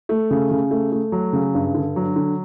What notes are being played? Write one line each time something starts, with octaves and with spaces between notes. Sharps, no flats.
A3
C#3
C#3
A3
A3
F#3
C#3
G2
D3
F#3
D3